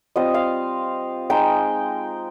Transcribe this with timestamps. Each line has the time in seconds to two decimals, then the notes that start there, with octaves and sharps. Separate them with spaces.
0.16 G3 C4 F4 D#5
0.34 F5
1.30 G#3 D#4 G5